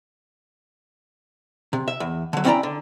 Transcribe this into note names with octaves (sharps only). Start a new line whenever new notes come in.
C3
E5
E2
D3 F#3
C4 C#4 E4 D5 G5 A#5
D3